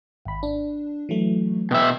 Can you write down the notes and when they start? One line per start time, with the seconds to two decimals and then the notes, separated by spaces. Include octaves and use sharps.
0.25 G#1 B5
0.43 D4
1.09 E3 F#3 A3
1.71 B2 E5 G5